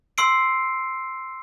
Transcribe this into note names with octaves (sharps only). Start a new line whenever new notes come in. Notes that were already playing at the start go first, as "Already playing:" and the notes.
C6 E6 C7 D7